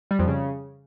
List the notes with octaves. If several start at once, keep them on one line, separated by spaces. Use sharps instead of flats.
G3
F2
C#3